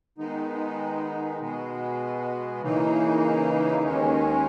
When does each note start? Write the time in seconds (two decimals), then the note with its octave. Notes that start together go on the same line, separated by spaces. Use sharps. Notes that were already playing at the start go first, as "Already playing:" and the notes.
0.18 D#3 G#3 B3 D#4
1.39 B2 G#3 B3
2.61 C#3 E3 A#3 D#4
3.83 D#2 D#3 G#3 C#4